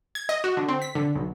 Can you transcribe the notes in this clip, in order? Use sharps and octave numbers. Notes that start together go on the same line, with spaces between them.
G#6
D#5
F#4
D3
C4
B6
D3
B1